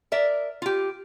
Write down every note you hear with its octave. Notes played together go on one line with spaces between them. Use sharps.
A#4 D5 E5
F4 G4